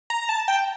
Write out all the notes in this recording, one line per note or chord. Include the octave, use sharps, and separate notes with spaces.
A#5
A5
G5